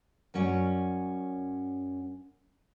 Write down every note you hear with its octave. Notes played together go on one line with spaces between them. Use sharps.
F#2 F#3 C#4 C#5 D5